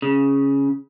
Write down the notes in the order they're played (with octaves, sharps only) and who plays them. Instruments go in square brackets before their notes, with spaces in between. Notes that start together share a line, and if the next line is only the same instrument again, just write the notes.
[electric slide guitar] C#3